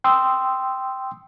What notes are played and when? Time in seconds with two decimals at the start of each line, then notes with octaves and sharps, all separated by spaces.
0.04 G5 C6 D#6 E6